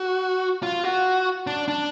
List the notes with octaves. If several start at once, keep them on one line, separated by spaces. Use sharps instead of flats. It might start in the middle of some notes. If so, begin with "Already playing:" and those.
Already playing: F#4
F4
F#4
D4
D4